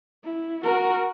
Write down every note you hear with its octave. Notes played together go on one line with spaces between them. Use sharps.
E4
F#4 A#4